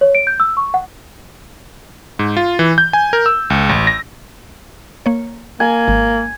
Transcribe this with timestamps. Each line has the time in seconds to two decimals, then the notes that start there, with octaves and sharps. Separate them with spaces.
0.01 C#5
0.15 D7
0.27 G6
0.40 E6
0.57 C#6
0.74 F#5
2.19 G#2
2.37 F4
2.59 E3
2.78 G6
2.93 G#5
3.13 A#4
3.26 E6
3.50 C#2
3.69 A1
3.87 A#6
5.06 A#3 C#5
5.60 A#3 G#5
5.88 G#1